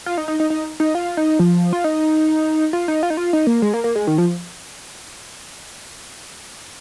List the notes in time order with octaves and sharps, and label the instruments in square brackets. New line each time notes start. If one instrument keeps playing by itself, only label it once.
[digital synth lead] F4
D#4
D#4
D#4
D#4
D#4
F4
D#4
F3
F4
D#4
F4
D#4
F4
D#4
F4
D#4
A#3
G#3
A#3
A#3
G#3
D#3
F3